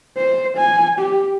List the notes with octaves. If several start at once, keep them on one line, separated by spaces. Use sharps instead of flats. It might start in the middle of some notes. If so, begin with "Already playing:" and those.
C5
G#5
G4